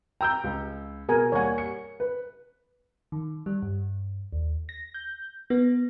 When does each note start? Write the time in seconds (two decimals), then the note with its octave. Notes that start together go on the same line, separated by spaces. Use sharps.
0.21 G5 A#5 E6 G6
0.44 C#2
1.09 B2 G#4 A#4 G#5
1.32 D#2 G3 C#5 F#5 G#5
1.58 C#7
2.00 B4
3.12 D#3
3.46 G3
3.62 G2
4.32 D#2
4.69 A#6
4.94 G6
5.50 B3